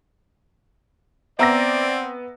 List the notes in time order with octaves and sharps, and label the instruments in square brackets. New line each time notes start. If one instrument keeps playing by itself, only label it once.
[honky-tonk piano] B3 E6 A#6 [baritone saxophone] C4 [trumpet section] D5 [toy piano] E5 A#5